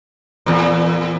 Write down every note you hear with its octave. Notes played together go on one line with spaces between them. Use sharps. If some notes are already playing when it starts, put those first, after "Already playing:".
E2 A#2